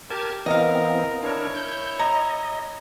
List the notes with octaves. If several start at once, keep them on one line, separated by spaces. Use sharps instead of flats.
G4 A#4 A5 G#6
E3 B3 C4 A#4 D#5 F5
D4 E4 A#4 C#5
G6
D#5 A#5